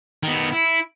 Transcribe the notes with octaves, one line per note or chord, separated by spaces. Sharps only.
D#3 B3
E4